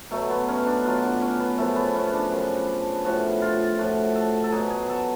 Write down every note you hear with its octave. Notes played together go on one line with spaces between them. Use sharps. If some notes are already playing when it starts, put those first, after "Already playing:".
B2 F#3 A3
B3
C#4
D4
B2 F#3 F4
D4
C#4
B3
F#2 C#3 F3 A3
B3
C#4
D4
F#2 C#3 F3
A2 F3 F#4
F4
A2 F3 F#4
A4
A4
B2 F#3 G#4
G#4
A4